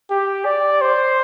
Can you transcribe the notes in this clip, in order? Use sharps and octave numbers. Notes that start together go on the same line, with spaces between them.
G4
D5
C5